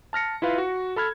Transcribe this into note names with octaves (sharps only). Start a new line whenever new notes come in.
A5 F6 A#6 C#7
E4 F4 B4 F5
F#4
A4 B5 F6 G#6